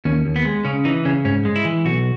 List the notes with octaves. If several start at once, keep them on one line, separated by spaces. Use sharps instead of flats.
D#2 C#4
D#2
B3
G#3
C#3 C#4
E3 D#4
C#3 C#4
G#2 C#4
G#3
E4
E3
B1 F#4